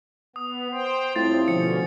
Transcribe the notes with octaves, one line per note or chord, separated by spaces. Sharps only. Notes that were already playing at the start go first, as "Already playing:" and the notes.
B3 D#6
C5 G5 C6
A2 G3 C4 F4 A6
B2 D3 F3 C#4 C#7